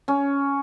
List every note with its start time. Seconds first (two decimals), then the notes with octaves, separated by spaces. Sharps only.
0.08 C#4